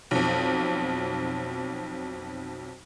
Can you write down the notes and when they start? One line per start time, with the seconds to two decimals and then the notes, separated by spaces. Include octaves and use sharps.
0.11 B1 F2